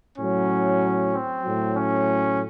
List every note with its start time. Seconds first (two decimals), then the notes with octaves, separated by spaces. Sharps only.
0.17 A2 F#3 C#4
1.12 C4
1.44 A2 F#3
1.76 C#4